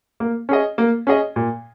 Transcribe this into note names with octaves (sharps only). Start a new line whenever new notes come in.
A#3
C#4 G#4 D#5
A#3
C#4 G#4 D#5
A#2